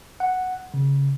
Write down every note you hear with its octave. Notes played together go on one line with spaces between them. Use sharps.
F#5
C#3